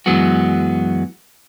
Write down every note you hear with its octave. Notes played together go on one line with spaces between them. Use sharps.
F#2 E3 F#3 G#3 B3 F#4